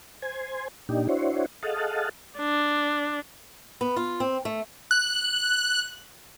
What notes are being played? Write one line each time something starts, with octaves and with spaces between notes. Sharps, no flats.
C5 G#5
A#2 D4 D#4 G4
D4 E4 F#4 C5 C#5
G#4 A4 D#5 F5 F#5 A5
D4
B3
F4
C4
A3
F#6